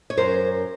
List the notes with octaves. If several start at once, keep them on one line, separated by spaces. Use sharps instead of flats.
C#5
F#2 A#4 C5